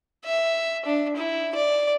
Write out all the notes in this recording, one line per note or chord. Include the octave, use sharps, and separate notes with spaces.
E5
D4
E4
D5